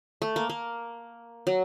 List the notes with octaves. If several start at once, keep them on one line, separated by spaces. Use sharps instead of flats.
A3
A#3
A#3
F#3